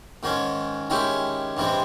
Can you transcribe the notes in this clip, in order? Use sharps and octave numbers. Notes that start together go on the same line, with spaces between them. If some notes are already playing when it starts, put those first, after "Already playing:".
G#2 D#3 G#3 C#4
D#3 G#3 C#4 E4 G4
G2 E3 G#3 C4